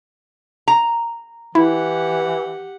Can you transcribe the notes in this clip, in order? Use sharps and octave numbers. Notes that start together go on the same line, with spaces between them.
A#5
E3 E4 G4 F#5